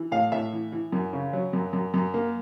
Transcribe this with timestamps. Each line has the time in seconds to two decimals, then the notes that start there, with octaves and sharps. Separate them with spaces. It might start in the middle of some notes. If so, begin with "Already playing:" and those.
Already playing: E3
0.12 A2 F5
0.32 A2 E5
0.53 E3
0.72 E3
0.92 F#2
1.13 C#3
1.33 F#3
1.53 F#2
1.73 F#2
1.94 F#2
2.14 A#3